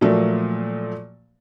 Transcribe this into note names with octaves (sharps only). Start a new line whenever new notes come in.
A#2 F3 F#3 A3 A#3